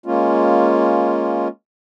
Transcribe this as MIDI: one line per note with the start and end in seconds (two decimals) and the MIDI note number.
0.06 1.48 56
0.06 1.48 58
0.06 1.48 61
0.06 1.48 65